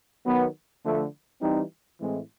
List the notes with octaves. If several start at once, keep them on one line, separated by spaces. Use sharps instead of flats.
D#3 F#3 B3
D3 F3 A3
E3 G3 C4 D#4
A2 E3 G#3 C4